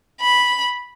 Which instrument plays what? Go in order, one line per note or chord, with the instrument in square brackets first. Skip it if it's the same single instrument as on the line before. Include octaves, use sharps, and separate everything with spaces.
[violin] B5